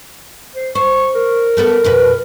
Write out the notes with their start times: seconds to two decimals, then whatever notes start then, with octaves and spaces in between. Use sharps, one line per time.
0.56 C5
0.75 C5 C#6
1.15 A#4
1.57 A3 B3 A4
1.84 F2 B2 B4